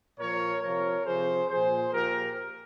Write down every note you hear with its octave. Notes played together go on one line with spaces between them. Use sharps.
A#2 F3 A#4 C#5
C3 F3 A#4 C#5
C3 F3 G#4 C5
A#2 F3 G#4 C5
A#2 F3 G4 A#4